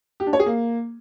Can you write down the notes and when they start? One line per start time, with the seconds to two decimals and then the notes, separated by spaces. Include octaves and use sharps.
0.20 G4
0.26 D4
0.33 C#5
0.40 G#4
0.46 A#3